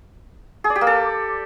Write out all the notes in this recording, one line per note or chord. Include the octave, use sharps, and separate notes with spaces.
G#4
D5
G4
A#3
A4